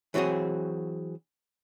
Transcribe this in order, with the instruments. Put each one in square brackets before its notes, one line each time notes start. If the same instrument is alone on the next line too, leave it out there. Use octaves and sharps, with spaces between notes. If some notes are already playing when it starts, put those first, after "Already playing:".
[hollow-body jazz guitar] E3 F#3 C4 F#4 G#4